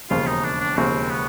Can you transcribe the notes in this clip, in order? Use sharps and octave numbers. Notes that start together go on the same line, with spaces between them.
E1 D#2 C#3 F3 F4
D#4
D4
D4
E1 D#2 C#3 F3 C4
B3